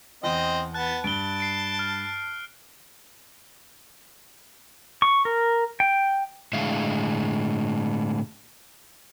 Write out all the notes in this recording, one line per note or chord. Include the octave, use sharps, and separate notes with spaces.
E2 C4 D#5
B3 A5 F#6
G2 A5 D7 G7
C7 D7
F6
C#6
A#4
G5
A2 D3 G#3 E5 F5